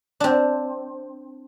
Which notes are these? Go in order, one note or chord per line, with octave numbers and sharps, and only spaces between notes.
C4 D4